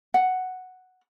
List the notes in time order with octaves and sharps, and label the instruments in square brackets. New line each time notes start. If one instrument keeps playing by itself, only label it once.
[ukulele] F#5